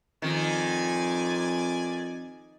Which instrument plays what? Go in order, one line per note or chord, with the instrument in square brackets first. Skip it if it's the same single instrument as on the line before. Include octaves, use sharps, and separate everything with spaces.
[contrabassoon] F2 [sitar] D#3 [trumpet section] D5 G#5